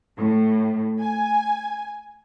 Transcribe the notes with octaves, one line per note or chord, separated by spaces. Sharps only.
A2
G#5